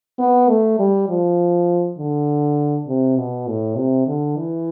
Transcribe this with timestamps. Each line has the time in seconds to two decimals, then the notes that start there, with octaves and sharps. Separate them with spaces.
0.19 B3
0.49 A3
0.79 G3
1.09 F3
1.98 D3
2.87 C3
3.17 B2
3.47 A2
3.77 C3
4.07 D3
4.37 E3